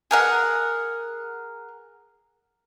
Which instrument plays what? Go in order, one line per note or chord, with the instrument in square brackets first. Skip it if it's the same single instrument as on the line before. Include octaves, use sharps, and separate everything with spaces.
[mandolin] G#4 A#4 F#5